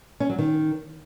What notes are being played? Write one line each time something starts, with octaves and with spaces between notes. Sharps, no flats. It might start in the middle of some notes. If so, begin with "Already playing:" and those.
C#4
F#3
D#3